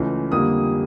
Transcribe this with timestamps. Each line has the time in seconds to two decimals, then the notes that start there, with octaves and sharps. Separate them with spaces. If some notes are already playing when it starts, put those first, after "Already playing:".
Already playing: C#2 C#3 E3 A3
0.32 F2 D3 G3 A#3 D#6